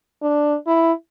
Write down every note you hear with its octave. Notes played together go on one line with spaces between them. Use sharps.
D4
E4